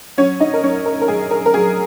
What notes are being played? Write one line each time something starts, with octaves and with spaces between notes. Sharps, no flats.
F#3 C#4 C#5
D#4 D#5
A#4
F#2 C#4 C#5
A#4
A#4
F#2 G#4
A#4
A#4
F#3 G#4